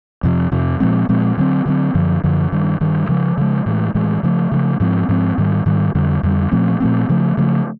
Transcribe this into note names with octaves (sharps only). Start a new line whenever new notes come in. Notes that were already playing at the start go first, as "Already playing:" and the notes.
F2 C3 F3
F2 C3 F3
A#2 F3 G#3 C4
A#2 F3 G#3 C4
D3 F#3 A3 C4
D3 F#3 A3 C4
F#2 D3 F3
F#2 D3 F3
G2 D#3 G3
G2 D#3 G3
C#3 F3 G#3
C#3 F3 G#3
A2 E3 G#3
A2 E3 G#3
C#3 F3 A3
C#3 F3 A3
G#2 F3 G#3 C4
G#2 F3 G#3 C4
G#2 D#3 G3
G#2 D#3 G3
F2 D3 G3
F2 D3 G3
A#2 F3 A3 C4
A#2 F3 A3 C4
C#3 F3 A3
C#3 F3 A3